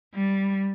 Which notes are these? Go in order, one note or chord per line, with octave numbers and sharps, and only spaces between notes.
G3